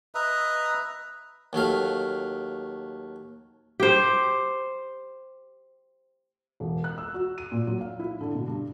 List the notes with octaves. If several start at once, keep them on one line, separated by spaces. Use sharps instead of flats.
B4 D#5 E5 A#5
D#2 F#3 A3 F5
G4 C5
E1
F#6
E6
F#4
D#7
A#2
F#3
F5
E4
D3
B2
G2